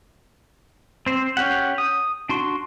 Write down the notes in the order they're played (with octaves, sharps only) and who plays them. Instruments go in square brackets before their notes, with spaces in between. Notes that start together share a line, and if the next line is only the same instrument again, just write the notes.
[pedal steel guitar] C4 C5
C#4 G4 F#5
D#6
D4 F#4 C6